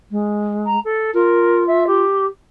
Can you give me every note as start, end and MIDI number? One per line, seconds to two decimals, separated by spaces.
0.11 0.76 56
0.66 0.79 82
0.85 1.13 69
1.14 2.04 65
1.14 1.64 70
1.67 1.84 76
1.87 2.26 67